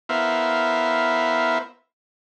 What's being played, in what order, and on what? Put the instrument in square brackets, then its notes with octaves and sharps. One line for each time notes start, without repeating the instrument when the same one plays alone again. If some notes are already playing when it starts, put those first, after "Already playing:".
[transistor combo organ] B3 E4 A#4 C5 E5 F5